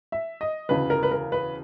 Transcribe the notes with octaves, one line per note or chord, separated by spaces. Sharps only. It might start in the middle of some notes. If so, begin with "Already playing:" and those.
E5
D#5
E1 D2 C#3 E3 B4
A#4
B4
A#4
B4